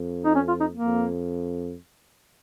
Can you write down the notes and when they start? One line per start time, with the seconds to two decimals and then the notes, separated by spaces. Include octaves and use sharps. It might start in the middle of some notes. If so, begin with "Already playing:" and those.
Already playing: F2
0.25 D#4
0.35 C#4
0.48 F4
0.60 D#4
0.73 A#3
0.85 F2